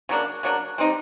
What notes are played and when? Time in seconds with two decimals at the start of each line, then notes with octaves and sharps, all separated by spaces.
0.09 C#3 F#3 A#3 D4
0.43 C#3 F#3 A#3 D4
0.78 G3 C4 D#4 G4